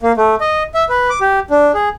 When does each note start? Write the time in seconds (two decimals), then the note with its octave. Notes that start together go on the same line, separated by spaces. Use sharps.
0.03 A#3
0.17 A3
0.41 D#5
0.74 E5
0.89 B4
1.10 D6
1.21 G4
1.50 D4
1.74 G#4